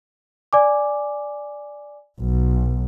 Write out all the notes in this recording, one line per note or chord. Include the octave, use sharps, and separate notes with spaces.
D5 G#5 D6
B1